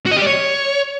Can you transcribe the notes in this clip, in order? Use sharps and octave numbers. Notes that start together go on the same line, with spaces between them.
F#4
D#5
G4
D5
C#5